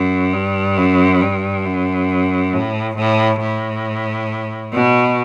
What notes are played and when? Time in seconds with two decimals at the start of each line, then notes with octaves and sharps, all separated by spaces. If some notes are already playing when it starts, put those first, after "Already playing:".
Already playing: F#2
0.33 G2
0.78 F#2
1.21 G2
1.65 F#2
2.53 A2
2.97 A2
3.41 A2
4.72 B2